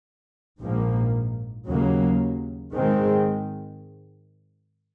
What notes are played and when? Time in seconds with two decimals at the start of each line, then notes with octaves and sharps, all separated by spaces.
0.60 A#1 G#2 F3 A#3
1.66 D#2 C#3 F#3 A#3
2.72 G#2 D#3 G#3 C4